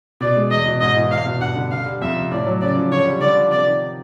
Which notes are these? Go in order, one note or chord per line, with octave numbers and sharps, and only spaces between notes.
B2 D5
G#3
E2 D#5
B2
G#2 D#5
E3
E2 F5
B2
G2 F#5
D3
D3 F5
G3
F2 E5
C3
A2 D5
F#3
C#3 D5
F3
D3 C#5
G3
D3 D5
F3
C3 D5
D#3